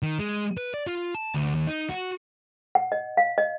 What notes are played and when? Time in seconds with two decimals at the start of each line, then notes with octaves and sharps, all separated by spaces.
0.03 D#3
0.19 G#3
0.58 B4
0.74 D5
0.87 F4
1.15 A5
1.34 D2
1.55 D#2
1.67 D#4
1.89 F#4
2.75 F#5
2.92 D#5
3.17 F5
3.38 D#5